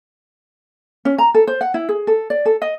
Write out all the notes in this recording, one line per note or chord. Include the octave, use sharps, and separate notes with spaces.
C#4
A#5
A4
C5
F#5
E4
G#4
A4
D5
A4
D#5